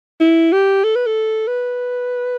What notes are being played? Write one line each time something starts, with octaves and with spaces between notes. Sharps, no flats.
E4
G4
A4
B4
A4
B4